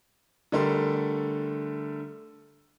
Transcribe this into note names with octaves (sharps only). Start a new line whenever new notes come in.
D3 G3 A3 A#4 C6